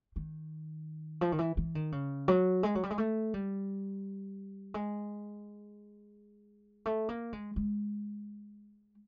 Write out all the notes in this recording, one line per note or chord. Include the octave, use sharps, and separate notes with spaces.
D#3
F3
D#3
E3
E3
D#3
C#3
F#3
G#3
F#3
G3
G#3
A3
G3
G#3
A3
A#3
G#3
G#3